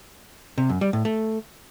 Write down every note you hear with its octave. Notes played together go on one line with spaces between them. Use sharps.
C3
F#2
G3
A2
A3